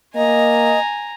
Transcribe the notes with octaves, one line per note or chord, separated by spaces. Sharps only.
A#3 D#5 G#5 A#5